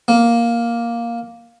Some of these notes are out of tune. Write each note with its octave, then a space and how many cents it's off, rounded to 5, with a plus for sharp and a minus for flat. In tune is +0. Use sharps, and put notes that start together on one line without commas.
A#3 +5